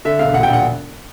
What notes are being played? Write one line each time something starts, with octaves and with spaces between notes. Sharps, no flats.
D3 E5
E1 F5
A#1 F#5
G5
A#1 F#5